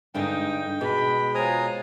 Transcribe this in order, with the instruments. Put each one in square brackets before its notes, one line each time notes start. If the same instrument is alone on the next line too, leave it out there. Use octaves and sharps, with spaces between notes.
[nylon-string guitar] G2 D3 G#3 [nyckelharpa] D#4 [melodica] G5
[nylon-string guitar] B2 [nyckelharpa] G#3 B5 [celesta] G#4
[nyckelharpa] G#3 F4 [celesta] C5 C#5 [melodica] G#5 A#5 D#6